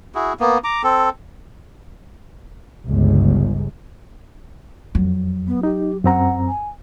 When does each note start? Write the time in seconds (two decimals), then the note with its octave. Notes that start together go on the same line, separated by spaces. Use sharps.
0.15 E4 F#4 G#4
0.40 A#3 B3
0.64 A#5 D6
0.83 C4 A4
2.86 G1 C#2
4.95 F2 F#3
5.47 B3
5.63 D#4 G4
6.04 F#2 C4 F#5 A#5
6.48 G#5